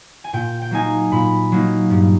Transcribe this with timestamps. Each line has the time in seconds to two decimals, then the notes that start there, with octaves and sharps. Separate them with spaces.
0.24 G#5
0.33 A#2 G5
0.62 G5
0.71 F#3 A#3 D#4 G#5
1.12 A#2 B5
1.52 F#3 A#3 D#4
1.90 G2